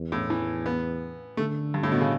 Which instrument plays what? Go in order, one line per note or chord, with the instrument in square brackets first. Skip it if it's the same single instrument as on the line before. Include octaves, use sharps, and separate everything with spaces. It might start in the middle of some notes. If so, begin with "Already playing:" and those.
Already playing: [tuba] E2
[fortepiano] A2
E3
B3
[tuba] D3 [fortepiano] A3
[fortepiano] G2
A2
B2
C#3